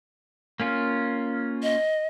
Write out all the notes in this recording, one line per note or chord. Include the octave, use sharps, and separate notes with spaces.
A#3 C#4 F4
D#5